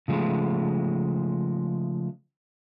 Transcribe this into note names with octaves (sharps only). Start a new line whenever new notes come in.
C#3 F3 G#3 A3